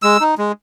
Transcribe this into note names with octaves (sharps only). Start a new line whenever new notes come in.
G#3 E6
D#4
G#3